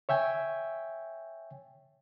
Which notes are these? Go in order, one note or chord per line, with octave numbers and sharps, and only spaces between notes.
C#5 E5 G5 G#5